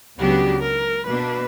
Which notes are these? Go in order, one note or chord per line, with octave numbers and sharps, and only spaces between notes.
C#2 C#3 F#3 B3 D4 G4
A#4
B2 A#3 D4 B4